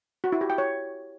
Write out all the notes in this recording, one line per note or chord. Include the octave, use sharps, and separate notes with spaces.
F#4
E4
G4
G5
C#5